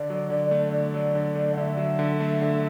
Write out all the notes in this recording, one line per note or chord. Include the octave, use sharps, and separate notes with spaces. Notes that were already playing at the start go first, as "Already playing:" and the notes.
Already playing: D3 D5
F#3
D3 D5
A3
D3 D5
F#3
D3
A3
F#5
D3 E5
F#3
D3
A3
D3